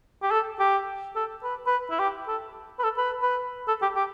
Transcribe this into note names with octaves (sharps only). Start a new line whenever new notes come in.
G4
A4
G4
A4
B4
B4
E4
G4
A4
B4
A4
B4
B4
A4
G4
G4